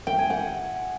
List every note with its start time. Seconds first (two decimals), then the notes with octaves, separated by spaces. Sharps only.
0.07 G5
0.18 G#5
0.30 F#5